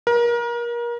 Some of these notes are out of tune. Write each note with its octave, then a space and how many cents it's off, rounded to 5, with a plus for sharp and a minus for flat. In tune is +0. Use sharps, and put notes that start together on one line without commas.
A#4 +30